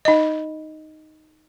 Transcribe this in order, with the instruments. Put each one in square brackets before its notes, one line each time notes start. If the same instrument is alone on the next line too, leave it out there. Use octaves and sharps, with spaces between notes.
[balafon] D#4 D#5